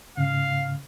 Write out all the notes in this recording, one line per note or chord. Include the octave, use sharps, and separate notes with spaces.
G#2 C#3 F5